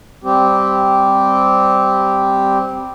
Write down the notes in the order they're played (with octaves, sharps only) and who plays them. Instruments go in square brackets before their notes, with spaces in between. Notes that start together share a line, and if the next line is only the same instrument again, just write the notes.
[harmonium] G3 C4 G4